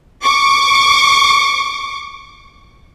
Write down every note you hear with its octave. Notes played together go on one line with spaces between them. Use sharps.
C#6 D6 C#7